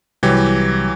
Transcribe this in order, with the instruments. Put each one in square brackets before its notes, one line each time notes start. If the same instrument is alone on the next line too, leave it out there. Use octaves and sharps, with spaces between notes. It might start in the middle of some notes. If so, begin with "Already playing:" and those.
[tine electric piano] C2 [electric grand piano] E3 F#3 G4